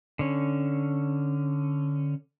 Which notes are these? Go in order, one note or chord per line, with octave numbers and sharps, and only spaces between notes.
D3 C#4